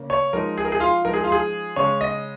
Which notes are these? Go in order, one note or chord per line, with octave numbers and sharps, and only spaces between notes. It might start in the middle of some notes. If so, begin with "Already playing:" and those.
Already playing: C#3 A#3 C#4
C#5
F3 G#3 D#4 A#4
G#4
A#4
G#4
F4
F3 G#3 D#4 A#4
G#4
F4
G#4
C#3 G#3 C#4 C#5
D#5